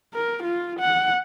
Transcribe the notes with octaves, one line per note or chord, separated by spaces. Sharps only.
A#4
F4
F#5